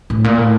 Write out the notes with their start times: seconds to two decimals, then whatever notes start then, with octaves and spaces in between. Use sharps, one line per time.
0.10 A2
0.24 A#2
0.38 A2